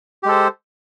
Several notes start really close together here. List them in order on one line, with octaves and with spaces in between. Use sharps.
G4 G#3 A4 C5